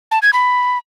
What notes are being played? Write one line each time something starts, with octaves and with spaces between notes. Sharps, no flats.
A5
G#6
B5